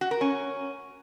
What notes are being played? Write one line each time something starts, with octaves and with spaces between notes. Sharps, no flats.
F#4
A#4
C#4